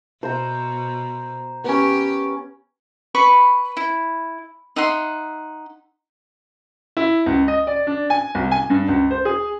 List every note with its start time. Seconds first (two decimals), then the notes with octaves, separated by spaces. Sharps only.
0.23 B2 C5 A#5
1.64 B3 C#4 G4
3.15 B4 B5 C#6
3.77 E4
4.76 D#4 E5 F#5 C6
6.97 E4
7.26 C#2
7.48 D#5
7.67 D5
7.87 D4
8.10 G#5
8.35 C2
8.51 G#5
8.70 G2
8.88 C#2
9.11 C5
9.25 G#4